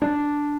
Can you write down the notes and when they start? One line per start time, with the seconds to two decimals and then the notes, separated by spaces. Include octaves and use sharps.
0.02 D4